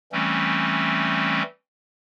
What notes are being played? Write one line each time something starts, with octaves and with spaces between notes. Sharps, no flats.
E3 G3 A3 C4 C#4